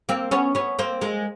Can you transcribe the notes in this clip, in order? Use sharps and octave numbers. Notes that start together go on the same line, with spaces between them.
A#3 C4
B3 C#4
B3 C#4
A#3 C4
G#3 A#3